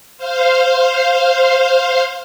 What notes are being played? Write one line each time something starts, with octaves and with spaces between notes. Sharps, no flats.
C5 F5